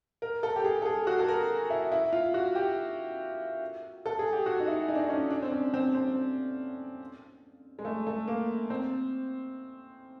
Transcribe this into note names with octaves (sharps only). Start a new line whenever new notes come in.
A#4
A4
G4
G#4
A4
G#4
F#4
A4
A#4
E4
E4
F4
F#4
G4
A4
G#4
G4
F#4
D#4
E4
D#4
D4
D#4
C#4
D4
C4
C#4
C4
C4
G#3
A3
A3
A#3
C4